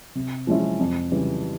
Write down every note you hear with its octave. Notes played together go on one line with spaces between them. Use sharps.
C3
F3 G#3 C#4 E4
F2
C#3 E3 G3